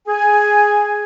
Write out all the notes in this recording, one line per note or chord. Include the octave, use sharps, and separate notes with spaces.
G#4 G#5